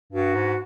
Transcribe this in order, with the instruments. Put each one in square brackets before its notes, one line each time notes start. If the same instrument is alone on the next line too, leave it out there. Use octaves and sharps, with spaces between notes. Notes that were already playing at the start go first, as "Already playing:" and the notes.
[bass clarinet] G2 [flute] F#4
[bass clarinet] G#2